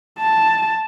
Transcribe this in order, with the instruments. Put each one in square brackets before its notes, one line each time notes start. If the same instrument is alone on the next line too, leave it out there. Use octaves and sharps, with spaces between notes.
[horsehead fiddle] A5